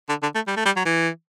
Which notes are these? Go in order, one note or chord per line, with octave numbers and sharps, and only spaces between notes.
D3
D3
A3
G3
A3
G3
F#3
E3